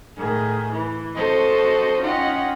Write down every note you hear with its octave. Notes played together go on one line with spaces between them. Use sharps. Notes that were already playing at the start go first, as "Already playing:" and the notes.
A2 D#3 G#4
E3
C4 F#4 A4 C5 D#5
C#4 D#4 F4 D#5 F#5 G5